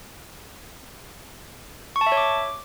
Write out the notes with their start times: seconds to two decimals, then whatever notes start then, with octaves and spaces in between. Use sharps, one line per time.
1.96 C#6
2.01 A5
2.06 E5
2.12 C#5
2.17 D6